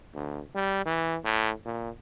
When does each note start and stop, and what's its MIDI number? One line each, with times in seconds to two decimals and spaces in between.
0.14 0.41 38
0.55 0.81 55
0.85 1.17 52
1.24 1.51 45
1.65 1.90 46